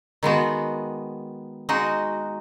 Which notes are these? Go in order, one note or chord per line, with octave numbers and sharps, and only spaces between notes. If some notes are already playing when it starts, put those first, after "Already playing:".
D#3 G#3 B3 F#4
G#3 D#4 F#4